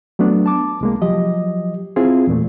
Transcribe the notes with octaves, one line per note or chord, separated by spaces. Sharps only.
F#3 A3 B3 D4
A5 D6
C2 G#3 A#3
F3 F#3 G4 D#5
C4 E4 F4 G#4
E2 A#2 A3